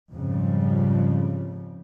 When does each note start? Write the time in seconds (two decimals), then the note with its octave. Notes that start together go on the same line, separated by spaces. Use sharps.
0.12 F2 G#2 C#3 F3 G3